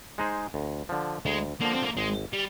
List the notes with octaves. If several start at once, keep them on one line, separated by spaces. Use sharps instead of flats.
G#3 D#4 G#4 C5
D2
D3 F3
D2 G#3
D3 F3 A#3
C4
A#3
G#1 G#3
G3